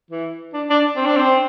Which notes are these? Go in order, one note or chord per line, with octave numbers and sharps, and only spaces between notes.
E3
D4
D4
C4
D4
C4